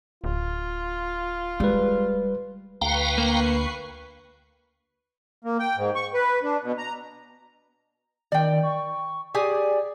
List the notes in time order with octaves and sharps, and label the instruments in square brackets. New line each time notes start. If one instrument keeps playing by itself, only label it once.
[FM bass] D1 [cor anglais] F4
[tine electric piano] G3 B4 [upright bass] G#3
[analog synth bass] D2 [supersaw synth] B4 C#6 C7 [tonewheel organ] F5 G5 A#5
[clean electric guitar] A#3
[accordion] A#3
G5
G#2
C#6
B4
D4
B2
A#5
[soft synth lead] D#3 [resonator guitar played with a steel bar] D5 G5
[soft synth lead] C#6
[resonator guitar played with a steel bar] G4 G#4 G#5 [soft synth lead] D5